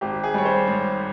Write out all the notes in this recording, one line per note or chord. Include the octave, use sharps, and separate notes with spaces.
G#1 G4
G#4
G3 C#5
C5
G#2